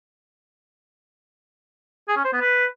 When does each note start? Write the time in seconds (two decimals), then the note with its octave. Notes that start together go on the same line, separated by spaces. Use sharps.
2.08 G#4
2.16 C#4
2.25 C5
2.33 B3
2.41 B4